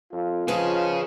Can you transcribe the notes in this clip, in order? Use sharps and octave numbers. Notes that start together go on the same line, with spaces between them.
F2 F4
F3 C#4 G#4 B4 C#5 D#5